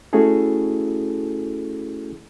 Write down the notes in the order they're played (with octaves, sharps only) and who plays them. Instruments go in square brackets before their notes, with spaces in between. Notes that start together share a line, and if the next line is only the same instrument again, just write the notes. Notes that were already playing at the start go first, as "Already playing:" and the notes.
[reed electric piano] A3 C#4 E4 F#4 G#4 A4